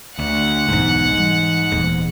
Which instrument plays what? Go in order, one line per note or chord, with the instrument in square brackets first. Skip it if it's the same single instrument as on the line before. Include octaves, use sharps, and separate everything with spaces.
[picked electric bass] D2 [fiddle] F#5
[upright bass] B1 E2 [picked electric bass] G#2
[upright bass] E3 G3
D#1 E2